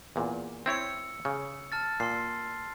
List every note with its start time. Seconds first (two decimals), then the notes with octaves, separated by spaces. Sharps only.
0.16 E2 A#2
0.66 C4 E4 C#5 E6 C#7
1.25 C#3
1.72 A5 F6 A6
2.00 A#2 C6 C7